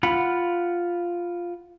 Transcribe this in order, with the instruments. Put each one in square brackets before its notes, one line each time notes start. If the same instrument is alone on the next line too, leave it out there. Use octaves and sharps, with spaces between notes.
[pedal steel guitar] F4 F#5 B5